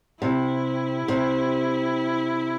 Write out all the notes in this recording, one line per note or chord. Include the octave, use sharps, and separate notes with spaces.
C3 E4
C3